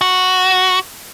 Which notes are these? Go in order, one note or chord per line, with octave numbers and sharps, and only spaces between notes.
F#4